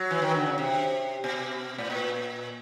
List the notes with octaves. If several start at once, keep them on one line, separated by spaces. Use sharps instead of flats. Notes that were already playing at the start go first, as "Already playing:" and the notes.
Already playing: F#3
E3
D#3
D3
C#3
C3
B2
A2
A#2